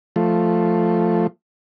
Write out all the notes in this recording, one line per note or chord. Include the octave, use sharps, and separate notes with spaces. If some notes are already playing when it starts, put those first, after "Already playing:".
F3 A3